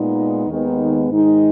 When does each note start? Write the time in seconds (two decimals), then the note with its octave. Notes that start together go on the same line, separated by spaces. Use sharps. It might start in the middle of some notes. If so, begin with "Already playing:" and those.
Already playing: A#2 G#3 B3 D#4
0.48 D#2 D#3 G#3 B3 D#4
1.10 G#2 D#3 G#3 D#4